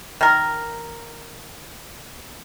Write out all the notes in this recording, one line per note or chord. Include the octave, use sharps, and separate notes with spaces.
D#3 A#4